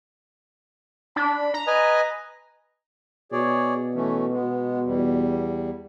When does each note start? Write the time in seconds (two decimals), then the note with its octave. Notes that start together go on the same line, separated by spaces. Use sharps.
1.16 D4 B5
1.54 A#5
1.67 B4 D#5 G#5
3.32 B2 G#4 C#5 D5
3.95 E3 A3 C#4
4.32 G#3 B3
4.85 E2 G3